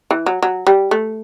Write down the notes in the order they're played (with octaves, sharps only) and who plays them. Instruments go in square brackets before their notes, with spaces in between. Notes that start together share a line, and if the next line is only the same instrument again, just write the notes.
[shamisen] E3
F#3
F#3
G3
A3